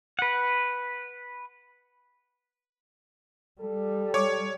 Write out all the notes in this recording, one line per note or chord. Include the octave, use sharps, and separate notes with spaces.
B4 F#5
G3 A4
C#5 C#6 D6